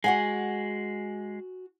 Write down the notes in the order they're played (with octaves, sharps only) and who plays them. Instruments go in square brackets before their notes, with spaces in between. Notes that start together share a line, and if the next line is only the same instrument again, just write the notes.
[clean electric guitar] G#3 [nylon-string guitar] F#4 F#5 G#5